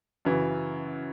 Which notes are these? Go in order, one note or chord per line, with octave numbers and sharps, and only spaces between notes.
F#2 C#3 E3